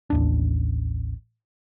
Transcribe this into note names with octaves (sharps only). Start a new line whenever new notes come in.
A1 D#2 D4